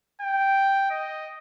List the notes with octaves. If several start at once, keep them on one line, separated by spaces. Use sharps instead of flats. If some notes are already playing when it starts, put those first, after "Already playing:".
G5
D#5